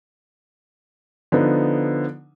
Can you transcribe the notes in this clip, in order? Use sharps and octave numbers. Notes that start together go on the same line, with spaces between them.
D3 F3 B3 D#4